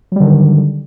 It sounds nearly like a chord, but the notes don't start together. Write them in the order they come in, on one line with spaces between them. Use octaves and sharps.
F#3 G3 D3 D#3